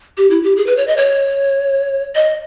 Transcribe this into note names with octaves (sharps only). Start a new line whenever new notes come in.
G4
E4
G4
G#4
B4
C#5
D#5
C#5
D#5